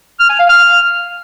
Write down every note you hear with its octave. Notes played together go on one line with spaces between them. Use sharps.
F6
G#5
F5
F6